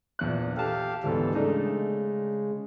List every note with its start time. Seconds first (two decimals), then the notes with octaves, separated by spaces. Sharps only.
0.19 A#1 E2 F#6
0.57 G4 A4 F5 A5
1.03 D2 G#2 B2 E3 G3 A4
1.35 C#3 G#3 A3 D4 D#4